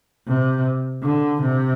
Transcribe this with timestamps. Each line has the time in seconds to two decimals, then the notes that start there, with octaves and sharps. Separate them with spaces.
0.27 C3
1.03 D3
1.42 C3